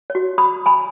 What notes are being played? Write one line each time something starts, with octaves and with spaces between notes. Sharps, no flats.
C#5
F#4
B5 D#6
G#5 B5